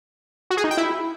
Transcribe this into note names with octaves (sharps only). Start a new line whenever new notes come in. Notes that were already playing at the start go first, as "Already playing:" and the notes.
F#4
G#4
D#4
G5
E4